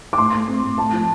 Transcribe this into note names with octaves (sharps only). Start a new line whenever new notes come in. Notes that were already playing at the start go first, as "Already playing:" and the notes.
D6
A2 C6
A3
C4
A2
A2 A5
F3